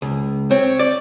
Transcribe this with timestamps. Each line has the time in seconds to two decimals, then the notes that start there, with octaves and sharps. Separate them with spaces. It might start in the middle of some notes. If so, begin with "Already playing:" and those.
0.02 C#2
0.51 C4 C#5
0.79 D5